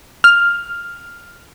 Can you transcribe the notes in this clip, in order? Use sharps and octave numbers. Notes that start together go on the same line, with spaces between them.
F6